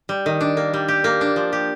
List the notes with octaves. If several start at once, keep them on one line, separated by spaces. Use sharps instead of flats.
G3
D#3
D4
A#3
G3
G4
A#3
D4
F3
G4